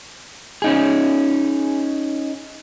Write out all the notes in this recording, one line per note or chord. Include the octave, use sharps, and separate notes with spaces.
C#4 D#4 G#4